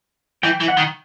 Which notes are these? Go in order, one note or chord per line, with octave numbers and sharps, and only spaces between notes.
E3 G5
E3
F#5
D#3